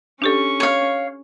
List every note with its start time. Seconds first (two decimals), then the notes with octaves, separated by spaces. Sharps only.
0.22 C#4 D4 G4 A4 C#6
0.60 C#5 F5